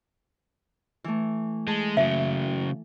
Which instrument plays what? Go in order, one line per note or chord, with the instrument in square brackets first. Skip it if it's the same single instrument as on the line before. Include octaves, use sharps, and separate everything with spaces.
[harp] E3 A3
[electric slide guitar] G#3 [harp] A5
[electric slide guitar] C#3 F#3 [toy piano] E5